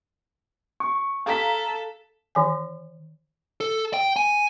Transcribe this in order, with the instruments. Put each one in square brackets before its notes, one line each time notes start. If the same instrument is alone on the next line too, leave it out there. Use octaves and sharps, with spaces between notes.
[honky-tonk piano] C#6
[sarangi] A4 [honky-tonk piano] F5 A#5 B6
[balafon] D#3 E3 G#5
[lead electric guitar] A4
G5
G#5